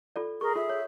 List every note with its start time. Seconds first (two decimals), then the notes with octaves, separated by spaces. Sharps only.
0.16 F4 A4 D5
0.41 G#4 A#4 C#6
0.56 F4 E5
0.69 C#5